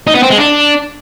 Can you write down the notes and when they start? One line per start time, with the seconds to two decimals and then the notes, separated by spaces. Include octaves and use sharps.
0.07 D#4
0.15 B3
0.23 C4
0.30 G#3
0.38 D4